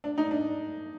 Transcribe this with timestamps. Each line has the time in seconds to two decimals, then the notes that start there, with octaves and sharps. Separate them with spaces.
0.04 D4
0.18 D#4
0.31 D4